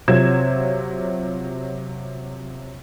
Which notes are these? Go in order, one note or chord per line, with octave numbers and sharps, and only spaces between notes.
C3 F#3 F4 G#6 E7